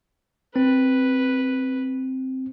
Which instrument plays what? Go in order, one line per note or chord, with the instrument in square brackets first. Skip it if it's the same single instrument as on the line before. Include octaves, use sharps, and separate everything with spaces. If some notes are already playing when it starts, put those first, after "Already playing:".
[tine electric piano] C4 [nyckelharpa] B4